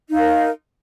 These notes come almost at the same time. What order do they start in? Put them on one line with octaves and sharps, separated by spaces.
D#4 F5 A#4